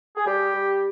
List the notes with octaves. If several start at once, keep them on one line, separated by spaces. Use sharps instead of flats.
G#4
G3 G4
G3